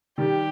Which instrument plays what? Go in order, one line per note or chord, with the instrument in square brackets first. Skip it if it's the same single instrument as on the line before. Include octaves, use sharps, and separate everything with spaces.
[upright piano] D#3 G3 [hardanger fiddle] G4